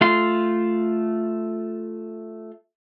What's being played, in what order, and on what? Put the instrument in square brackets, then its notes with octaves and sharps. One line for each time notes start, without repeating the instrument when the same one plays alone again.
[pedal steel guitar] A3 F4 C6